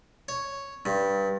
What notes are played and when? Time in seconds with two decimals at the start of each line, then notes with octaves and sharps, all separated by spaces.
0.28 C#5
0.86 G2